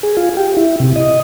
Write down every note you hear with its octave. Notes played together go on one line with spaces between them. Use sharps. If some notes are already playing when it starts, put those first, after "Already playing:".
G#4
F4
G4
E4
C3
D#5